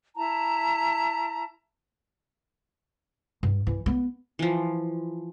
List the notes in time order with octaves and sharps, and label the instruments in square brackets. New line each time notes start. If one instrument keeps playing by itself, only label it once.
[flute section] E4 A5 A#5
[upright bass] G2
E3
B3
[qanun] E3 F3